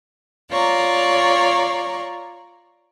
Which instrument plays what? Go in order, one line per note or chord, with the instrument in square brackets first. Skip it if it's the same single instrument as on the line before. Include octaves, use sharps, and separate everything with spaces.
[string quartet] F4 C#5 D5 A#5